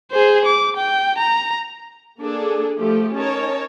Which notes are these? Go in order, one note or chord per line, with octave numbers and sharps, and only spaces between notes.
G#4 C5
D6
G5
A#5
A#3 D4 G#4 A4
F3 A3 G4
C#4 D#4 A#4 C#5 A5